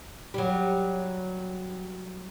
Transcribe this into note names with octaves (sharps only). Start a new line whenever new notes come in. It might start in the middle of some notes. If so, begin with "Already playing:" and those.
F#3 G3